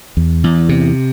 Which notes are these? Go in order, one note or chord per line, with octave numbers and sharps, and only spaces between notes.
E2
E2
C3